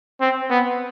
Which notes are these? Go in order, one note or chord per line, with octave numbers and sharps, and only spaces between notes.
C4
B3